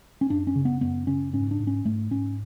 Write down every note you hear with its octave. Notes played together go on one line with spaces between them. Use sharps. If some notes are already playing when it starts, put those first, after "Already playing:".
C#4
F#2 D4
C#4
C#3
B3
F#2 B3
C#3 C#4
G#2 C#4
D4
G#2
C#4
G#2 A3
G#2 C#4